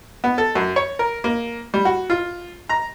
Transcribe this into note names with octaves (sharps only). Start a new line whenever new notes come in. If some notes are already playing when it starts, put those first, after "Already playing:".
B3
A4
F#2
C#5
A#4
A#3
G3
F#4
F4
A#5